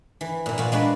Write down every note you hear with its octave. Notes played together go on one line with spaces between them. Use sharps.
E3
A#2 E3
A#2 A#3 F4 F#4
G#3 D4 F#4 B4 D5